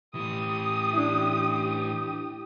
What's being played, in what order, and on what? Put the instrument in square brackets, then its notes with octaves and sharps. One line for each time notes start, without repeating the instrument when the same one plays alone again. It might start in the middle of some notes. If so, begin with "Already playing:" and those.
[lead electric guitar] A2 E3 [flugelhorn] G4 [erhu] D#6
[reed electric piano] D4 E4